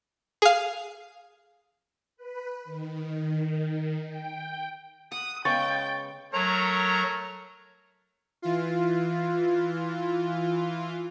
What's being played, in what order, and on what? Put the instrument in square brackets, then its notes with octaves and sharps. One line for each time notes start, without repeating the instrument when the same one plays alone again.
[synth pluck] G#4 F5
[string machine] B4
D#3
G5
[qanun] F#5 [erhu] D#6
[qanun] C#3 G#3 B3 [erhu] G5 [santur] C#6 [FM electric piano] A6
[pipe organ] F#3 A#5 [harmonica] A3 A#4 C#5
[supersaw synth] E3 F4